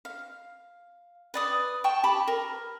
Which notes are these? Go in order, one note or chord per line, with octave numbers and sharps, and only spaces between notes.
F5
B4 D5 D#6
G5 A5 C#6
G4 A5 B5
A#4